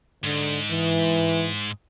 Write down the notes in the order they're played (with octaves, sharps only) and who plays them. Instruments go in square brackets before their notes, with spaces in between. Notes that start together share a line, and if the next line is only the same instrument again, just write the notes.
[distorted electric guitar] G#2 [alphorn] D3
[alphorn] E3